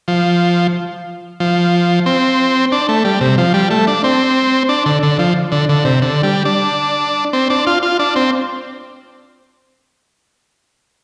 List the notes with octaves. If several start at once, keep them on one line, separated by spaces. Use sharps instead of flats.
F3
F3
C4
D4
A3
G3
C3
F3
G3
A3
D4
C4
D4
D3
D3
F3
D3
D3
C3
D3
G3
D4
C4
D4
F4
F4
D4
C4